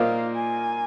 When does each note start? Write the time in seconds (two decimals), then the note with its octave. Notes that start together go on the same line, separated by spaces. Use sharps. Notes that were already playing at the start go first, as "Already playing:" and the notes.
Already playing: A#2 A#3 F4 C5 D#5 F5
0.35 G#5